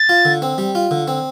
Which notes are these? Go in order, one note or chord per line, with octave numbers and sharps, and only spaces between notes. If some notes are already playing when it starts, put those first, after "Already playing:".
Already playing: A6
F4
D3
C4
G3
F4
D3
C4